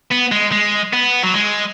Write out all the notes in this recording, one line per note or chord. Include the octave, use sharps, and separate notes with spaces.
B3
G#3
G#3
B3
F#3
G#3